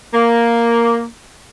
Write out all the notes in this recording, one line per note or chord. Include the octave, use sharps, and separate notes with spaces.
A#3